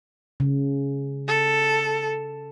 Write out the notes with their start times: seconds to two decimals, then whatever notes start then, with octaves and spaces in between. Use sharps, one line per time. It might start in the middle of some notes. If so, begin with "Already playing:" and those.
0.40 C#3
1.28 A4